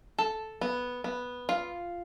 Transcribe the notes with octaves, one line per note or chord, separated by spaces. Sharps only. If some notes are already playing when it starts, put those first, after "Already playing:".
A4
B3
B3
F4